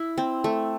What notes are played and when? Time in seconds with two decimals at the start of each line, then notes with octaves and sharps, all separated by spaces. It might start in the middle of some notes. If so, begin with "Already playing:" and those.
Already playing: E4
0.18 C4
0.44 A3